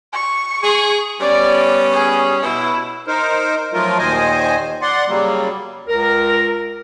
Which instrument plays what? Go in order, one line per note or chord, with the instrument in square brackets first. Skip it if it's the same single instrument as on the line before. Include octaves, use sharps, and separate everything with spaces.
[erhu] C#6
[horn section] G#4
[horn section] G3 B3 C#4 [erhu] D5
[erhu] G#4
[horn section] B2 [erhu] E4
[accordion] D#4 A#4 C5
F3 F#3 A3 F4 A#4
D#2 A#2 D#3 C5 D#5 G#5
D5 F#5 C6
C#3 F#3 G3 A#3
[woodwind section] C#2 A#4